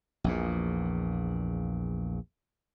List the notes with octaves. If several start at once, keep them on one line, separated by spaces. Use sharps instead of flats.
A#1 E2 A#2